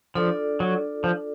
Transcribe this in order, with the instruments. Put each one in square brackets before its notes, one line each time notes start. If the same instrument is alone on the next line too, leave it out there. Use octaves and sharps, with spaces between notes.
[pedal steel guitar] F3 [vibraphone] D4 F4 A4 D5
[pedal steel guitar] F#3
F3